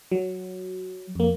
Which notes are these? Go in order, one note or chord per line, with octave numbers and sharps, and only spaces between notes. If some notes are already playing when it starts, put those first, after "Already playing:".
F#3
F2 A#3